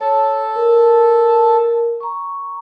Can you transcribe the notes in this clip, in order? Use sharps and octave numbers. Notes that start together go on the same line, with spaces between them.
A4 C#5 A5
A#4
A#5 C#6